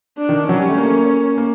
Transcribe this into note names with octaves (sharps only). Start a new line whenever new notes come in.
D4
D#3
F#3 C#4
G3
A3
A#3
A#3